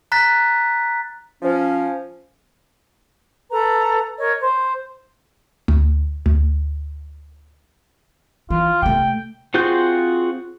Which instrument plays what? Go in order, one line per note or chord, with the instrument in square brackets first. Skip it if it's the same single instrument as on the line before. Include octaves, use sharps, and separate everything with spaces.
[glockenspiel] A#5 F#6 A6 B6
[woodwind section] F3 C#4
[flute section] A4 B4 A#5
A#4 C#5 D#5
C5
[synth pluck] D2
D2
[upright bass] E3 [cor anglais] F4
[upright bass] C3 A3 [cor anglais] G5
[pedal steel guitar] C4 F4 F#4 G#4 G6